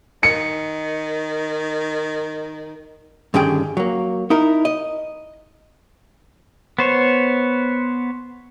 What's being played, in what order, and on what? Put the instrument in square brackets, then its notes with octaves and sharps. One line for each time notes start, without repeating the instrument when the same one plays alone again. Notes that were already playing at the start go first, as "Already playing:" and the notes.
[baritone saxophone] D#3 [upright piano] C#7
[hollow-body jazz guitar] G2 D3 D#3 C#4 G#4 G5
F#3 A#3
D#4 E4 A#4
D#5
[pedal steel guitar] B3 C5 C#5